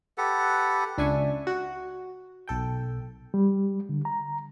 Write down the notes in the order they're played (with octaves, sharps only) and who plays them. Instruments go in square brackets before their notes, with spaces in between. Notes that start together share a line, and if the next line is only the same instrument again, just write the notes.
[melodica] G4 A4 B4 F#5
[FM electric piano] C#2 D4 E5 G#5 C#6
F#4
B1 A4 G5
[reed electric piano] G3
D3
A#5